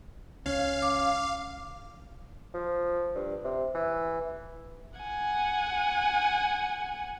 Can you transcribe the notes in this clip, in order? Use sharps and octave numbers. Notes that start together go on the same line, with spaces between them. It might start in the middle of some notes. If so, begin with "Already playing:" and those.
C#2 C#4 F5
D6
F3
G2
C3
E3
F#5 G#5